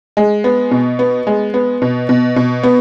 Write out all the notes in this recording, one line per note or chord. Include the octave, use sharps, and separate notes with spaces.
G#3
B3
B2
B3
G#3
B3
B2
B2
B2
B3